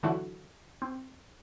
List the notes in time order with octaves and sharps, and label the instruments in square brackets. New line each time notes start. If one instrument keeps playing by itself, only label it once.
[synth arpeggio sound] D3 E3 F#3 E4 F#4
C4